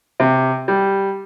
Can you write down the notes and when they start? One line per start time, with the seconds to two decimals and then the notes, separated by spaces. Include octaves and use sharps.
0.20 C3
0.68 G3